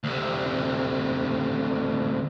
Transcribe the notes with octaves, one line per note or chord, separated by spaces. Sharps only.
D2 C3